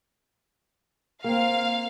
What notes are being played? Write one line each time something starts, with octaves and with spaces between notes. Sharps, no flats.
A#3 C4 F5